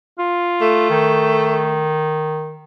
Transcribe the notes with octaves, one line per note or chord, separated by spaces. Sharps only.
F4
A3
D#3